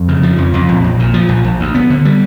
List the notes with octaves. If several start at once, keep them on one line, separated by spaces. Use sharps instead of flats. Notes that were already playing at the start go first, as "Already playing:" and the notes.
Already playing: F2
C#3
F3
F2
F2
A#1
A#1
A#2
F3
A#1
A#1
D2
B3
D3
G3